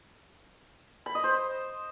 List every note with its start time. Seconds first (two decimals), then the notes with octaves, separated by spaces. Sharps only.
1.06 B5
1.15 D#5
1.24 C5